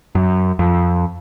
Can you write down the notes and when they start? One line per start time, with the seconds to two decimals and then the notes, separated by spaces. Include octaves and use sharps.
0.15 F#2
0.59 F2